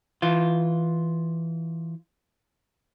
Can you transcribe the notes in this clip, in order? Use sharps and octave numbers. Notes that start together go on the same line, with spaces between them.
E3 F4